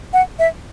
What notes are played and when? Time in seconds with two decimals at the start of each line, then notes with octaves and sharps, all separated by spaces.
0.13 F#5
0.39 E5